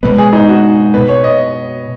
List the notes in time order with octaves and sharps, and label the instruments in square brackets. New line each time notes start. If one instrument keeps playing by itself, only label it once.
[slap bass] B2 G#3 B3 [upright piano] B4
[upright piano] G#4
D#4
F#4
[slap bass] B2 B3 [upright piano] B4
[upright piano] C#5
D#5